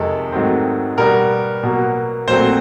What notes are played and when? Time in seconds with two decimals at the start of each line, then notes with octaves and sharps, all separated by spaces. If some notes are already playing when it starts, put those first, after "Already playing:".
Already playing: F2 C3 D#3 G#3 A4
0.32 G#2 D#3 F#3 A3 C4
0.98 B2 G3 B3 A#4
1.63 B2 F#3 A#3
2.28 A#2 F#3 A3 C4 C5